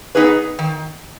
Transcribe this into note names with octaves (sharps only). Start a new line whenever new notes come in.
B3 D#4 G#4 B4
D#3